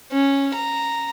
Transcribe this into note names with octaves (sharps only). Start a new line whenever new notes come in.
C#4
A#5